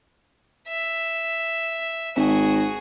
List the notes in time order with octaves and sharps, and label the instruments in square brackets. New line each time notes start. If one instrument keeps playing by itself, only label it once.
[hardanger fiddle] E5
[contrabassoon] G#1 [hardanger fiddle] F#4 G#4